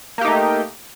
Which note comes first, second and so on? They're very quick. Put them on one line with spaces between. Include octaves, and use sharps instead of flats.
A#3 G4 D#4 A3